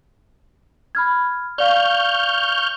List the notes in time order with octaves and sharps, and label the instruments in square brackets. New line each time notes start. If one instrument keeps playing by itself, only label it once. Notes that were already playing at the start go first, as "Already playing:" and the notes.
[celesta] B5 F6 G#6
[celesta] D5 F5 [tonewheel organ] C#6 F6 G6